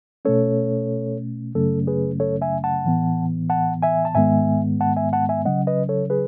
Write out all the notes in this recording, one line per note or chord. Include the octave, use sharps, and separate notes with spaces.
B2 A3 C#4 A4 C#5
F#2 C#3 F#3 A3 C#4 A4
G#4 B4
A4 C#5
E5 G#5
F#5 A5
A2 E3 B3
F#5 A5
E5 G#5
A5
G#2 D#3 G#3 B3 E5 G#5
F#5 A5
E5 G#5
F#5 A5
E5 G#5
C#3 F#3 C#4 D#5 F#5
B4 D#5
A4 C#5
G#4 B4